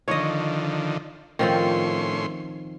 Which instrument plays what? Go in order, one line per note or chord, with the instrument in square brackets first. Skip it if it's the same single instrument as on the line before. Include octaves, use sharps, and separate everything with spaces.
[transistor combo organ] D3 D#3 F3 [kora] C#5 D#5
[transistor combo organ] A2 C#4 C6 [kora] D#3 F3 C4